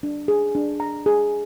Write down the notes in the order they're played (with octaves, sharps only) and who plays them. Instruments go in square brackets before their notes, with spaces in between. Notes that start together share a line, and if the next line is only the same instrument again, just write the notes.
[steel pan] D4
G#4
D4
A#5
G#4